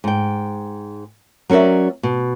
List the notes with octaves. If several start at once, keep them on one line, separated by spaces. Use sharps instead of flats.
G#2 G5
F#3 C#4 A#4 D5 E5
B2